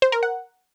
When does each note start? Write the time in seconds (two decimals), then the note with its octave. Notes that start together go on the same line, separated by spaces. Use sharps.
0.02 C5
0.12 A#4
0.23 F#5